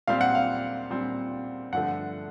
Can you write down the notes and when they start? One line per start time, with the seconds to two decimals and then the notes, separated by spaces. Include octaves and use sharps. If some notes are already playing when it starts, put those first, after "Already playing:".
0.07 A#2 G3 C4 F5
0.21 F#5
0.35 F5
0.90 A#2 G3 C4
1.73 G2 D3 F3 A3 F#5